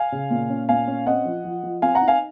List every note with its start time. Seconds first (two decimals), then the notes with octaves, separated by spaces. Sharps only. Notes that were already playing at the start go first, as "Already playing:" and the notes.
Already playing: F5 G#5
0.12 C#3
0.30 A#2
0.50 C#4
0.69 A#2 F5 G#5
0.88 C#4
1.06 C4 D#5 F#5
1.25 F3
1.45 F3
1.63 F3
1.82 C4 F5 G#5
1.95 F#5 A#5
2.01 D#4
2.08 F5 G#5